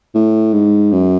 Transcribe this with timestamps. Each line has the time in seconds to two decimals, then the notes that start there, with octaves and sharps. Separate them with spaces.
0.15 A2
0.53 G#2
0.92 F#2